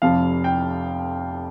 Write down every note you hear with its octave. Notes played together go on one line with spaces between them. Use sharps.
F1 F2 C3 F3 F5
G5